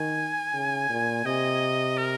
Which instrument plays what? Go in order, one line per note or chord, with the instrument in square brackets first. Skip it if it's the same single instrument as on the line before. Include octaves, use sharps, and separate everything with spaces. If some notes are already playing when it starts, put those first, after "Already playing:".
Already playing: [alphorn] D#3 [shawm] G#5
[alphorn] C#3
A#2
[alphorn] C3 [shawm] D#5
[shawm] A#4